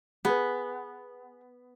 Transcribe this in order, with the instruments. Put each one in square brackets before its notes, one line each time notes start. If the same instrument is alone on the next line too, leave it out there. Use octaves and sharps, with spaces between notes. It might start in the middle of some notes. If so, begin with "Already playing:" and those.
[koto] B3 [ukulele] G#4 B4